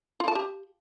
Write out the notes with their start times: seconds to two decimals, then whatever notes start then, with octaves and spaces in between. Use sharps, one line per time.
0.20 F4
0.28 A5
0.35 G4